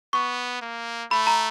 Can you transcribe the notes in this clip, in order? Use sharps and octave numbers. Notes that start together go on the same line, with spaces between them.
B3 C#6
A#3
A3 B5
A#5